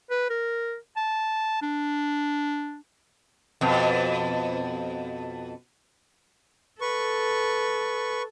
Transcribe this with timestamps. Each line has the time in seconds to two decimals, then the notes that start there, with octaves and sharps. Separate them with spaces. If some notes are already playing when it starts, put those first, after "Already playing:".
0.11 B4
0.30 A#4
0.97 A5
1.62 D4
3.61 F2 B2
6.81 A4 B4 C#6